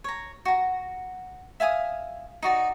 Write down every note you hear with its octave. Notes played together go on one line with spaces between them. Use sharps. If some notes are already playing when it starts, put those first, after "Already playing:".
C#5 A#5
F#4 A#5
E5 F5 G#5 D#6
D#4 F#4 D5